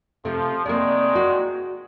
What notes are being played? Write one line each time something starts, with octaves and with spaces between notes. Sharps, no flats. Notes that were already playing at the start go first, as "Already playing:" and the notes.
C3 F3 A3
G#2 C3 D#3 G#3 A#3 D5
F#4